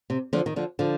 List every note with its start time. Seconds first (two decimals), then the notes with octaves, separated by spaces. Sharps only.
0.10 C3
0.33 D3 F3
0.46 D#3
0.56 D3 F3
0.79 D3 F3